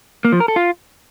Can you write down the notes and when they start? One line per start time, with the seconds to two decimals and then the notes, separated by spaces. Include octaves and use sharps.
0.25 A#3
0.32 F3
0.40 A#4
0.48 A4
0.56 F4